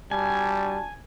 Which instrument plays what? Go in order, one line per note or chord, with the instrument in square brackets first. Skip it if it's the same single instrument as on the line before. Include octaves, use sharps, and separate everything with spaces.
[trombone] G3 [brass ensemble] D4 F#4 A5 [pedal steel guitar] G#5